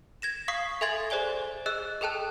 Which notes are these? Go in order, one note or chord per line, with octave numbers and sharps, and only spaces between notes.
G#6 A#6 E7
F5 C#6 D#6 B6 C7
A4 E5 G#5 C6 G#6 A6
G#4 C5 D5 G#5 G7
G#4 D#5 E6 F#6
G#4 A4 G5 A5 F#6